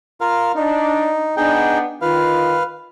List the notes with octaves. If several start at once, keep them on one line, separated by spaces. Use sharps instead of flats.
F4 A#4 F5
D4 D#4
B3 D4 D#4 G#4 G5
D#3 F4 B4 F5